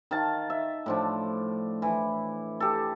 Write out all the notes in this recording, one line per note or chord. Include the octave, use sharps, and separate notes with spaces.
D#3 F5 A5
E5
A2 F3 D4
E3
G4 A4